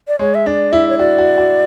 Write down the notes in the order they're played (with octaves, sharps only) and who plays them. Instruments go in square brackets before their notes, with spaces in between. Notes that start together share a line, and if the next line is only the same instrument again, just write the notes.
[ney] D5
[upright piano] G#3 [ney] C#5
[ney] E5
[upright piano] D4 [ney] D5
[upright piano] E4 [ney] E5
[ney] C#5
[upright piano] F#4 [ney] D5
[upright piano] F#4
F#4